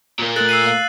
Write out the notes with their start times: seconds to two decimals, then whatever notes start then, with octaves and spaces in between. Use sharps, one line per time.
0.19 A#2 A#3
0.36 A3 A4 F#6 A6 F#7
0.49 E6 C7 D#7
0.67 F5